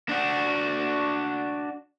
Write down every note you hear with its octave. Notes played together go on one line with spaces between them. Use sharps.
D4 F#4